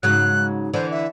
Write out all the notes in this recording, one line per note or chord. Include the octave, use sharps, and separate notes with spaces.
G#2 C#3 F#3 F#6
D3 E3 D4 C5
E5